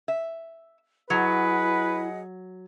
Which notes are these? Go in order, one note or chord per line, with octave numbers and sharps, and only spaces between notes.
E5
F#3 E4 G#4 B4 D#5 F#5